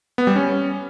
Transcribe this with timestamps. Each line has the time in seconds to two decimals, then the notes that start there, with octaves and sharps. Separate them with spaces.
0.18 B3
0.27 G3
0.36 C#4